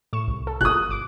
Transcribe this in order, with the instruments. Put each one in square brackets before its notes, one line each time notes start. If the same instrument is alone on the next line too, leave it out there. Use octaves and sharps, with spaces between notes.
[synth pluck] A2 C#6 E7
C2
A4
[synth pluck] G1 B2 [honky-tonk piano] D#6 F#6
[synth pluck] G1 D6 D7